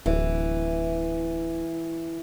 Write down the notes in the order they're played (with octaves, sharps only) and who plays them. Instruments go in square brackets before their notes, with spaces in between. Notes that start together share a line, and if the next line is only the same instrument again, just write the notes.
[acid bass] D1 [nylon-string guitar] E3